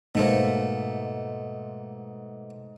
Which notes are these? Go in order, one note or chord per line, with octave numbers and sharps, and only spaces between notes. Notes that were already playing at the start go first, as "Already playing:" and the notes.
G#2 B2 A3 A#3 C5